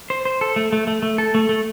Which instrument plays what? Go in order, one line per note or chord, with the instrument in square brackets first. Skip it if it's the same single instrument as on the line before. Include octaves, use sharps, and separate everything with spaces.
[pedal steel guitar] C5
C5
A4
A3
A3
A3
A3
A4
A3
A3